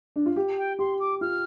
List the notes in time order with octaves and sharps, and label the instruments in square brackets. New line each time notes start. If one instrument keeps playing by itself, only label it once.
[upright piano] D4
F4
G4
[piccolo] G5
[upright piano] G4 [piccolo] C6
[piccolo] D6
[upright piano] F4 [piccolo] F6